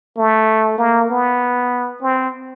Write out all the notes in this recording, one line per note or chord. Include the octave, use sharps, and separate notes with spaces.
A3
A#3
B3
C4